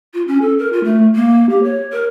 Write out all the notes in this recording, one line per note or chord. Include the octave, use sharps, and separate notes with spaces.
F4
C#4
A4
A#4
F4
A3
A#3
G4
C#5
A#4